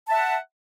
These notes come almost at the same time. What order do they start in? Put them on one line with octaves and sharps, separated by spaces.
A5 E5 F#5